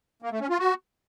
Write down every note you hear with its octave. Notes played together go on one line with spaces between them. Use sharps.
A#3
A3
C#4
F4
F#4